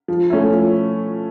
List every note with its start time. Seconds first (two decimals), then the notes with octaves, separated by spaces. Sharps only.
0.08 F3
0.30 A3 C#4 E4
0.53 F3